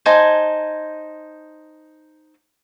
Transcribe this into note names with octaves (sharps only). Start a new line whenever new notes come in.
D#4 C5 G#5 A5